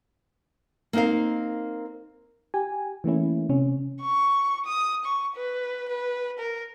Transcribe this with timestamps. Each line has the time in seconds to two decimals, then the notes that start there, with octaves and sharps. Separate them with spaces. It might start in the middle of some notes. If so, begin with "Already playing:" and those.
0.93 A#3 C4 D#4 A#4 F5
2.54 G4 G#5
3.04 E3 A3 A#3 C#4 E4
3.49 C3 C#4
4.02 C#6
4.66 D#6
5.04 C#6
5.36 B4
5.89 B4
6.39 A#4